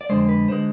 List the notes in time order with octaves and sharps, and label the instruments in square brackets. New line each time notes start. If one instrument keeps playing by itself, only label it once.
[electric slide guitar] D5
F2 D3 G#3 C5
B4
D3 G#3 C5